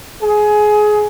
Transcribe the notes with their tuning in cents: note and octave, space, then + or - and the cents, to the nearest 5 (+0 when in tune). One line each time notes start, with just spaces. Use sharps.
G#4 +20